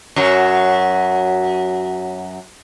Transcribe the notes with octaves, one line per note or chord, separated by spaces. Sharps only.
F#2 F#3